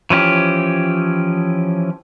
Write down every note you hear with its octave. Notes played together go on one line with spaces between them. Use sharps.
E3 F3 C#4 G4